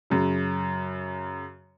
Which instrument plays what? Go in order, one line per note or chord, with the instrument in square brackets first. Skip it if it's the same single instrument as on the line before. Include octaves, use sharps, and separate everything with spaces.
[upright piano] F#2 C#3